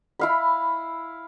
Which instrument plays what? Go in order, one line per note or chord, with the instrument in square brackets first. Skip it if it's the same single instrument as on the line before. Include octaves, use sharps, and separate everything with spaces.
[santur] E4 F5 B5